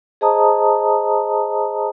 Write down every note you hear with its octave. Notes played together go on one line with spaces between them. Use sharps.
G#4 C5 D#5 A5 A#5 D#6